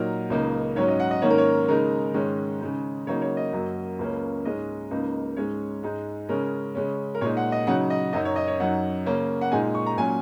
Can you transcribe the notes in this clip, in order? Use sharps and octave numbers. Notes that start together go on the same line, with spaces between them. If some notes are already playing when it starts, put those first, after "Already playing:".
Already playing: A#2 F#3 D#4 A#4
C#2 C#3 A#3 D#4
G#2 F#3 C#4 C#5
D#5
F#5
D#5
G#2 D#3 A#3 C#4 C#5
A#4
C#5
C#3 G#3 D#4 A#4
G#2 D#3 G#3 C#4
C#3 G#3 D#4
C#3 F#3 A#3 D#4 C#5
C#5
D#5
F#2 F#3 A#3
C#2 C#3 A#3 C#4
G#2 G#3 C#4 D#5
C#2 C#3 A#3 D#4
G#2 G#3 C#4 C#5
G#2 G#3 D#4
C#3 G#3 C#4 A#4
C#3 G#3 C#4
A#4
A#2 G#3 D#4 C#5
F#5
D#5
C#3 F#3 D#4 F#5
D#5
F#2 F#3 D#4 D#5
C#5
D#5
C#5
F#2 F#3 D#4 F#5
C#3 A#3 C#4
F#5
A#2 G#3 D#4 G#5
C#6
A#5
A#2 F#3 C#4 G#5